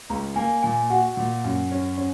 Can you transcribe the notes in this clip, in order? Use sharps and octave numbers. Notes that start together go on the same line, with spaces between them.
C#2 A#5
A#3 G#5
A#2 G#5
F#4 F#5
A#2
F#2
C#4
C#4